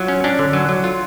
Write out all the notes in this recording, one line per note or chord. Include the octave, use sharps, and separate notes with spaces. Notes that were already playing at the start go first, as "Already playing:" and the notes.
Already playing: F#3 F4
C#4
C#4 D4
D3
F#3
F#3
F4